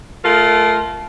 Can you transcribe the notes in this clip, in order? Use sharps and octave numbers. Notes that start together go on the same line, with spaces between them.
A3 F4 A#4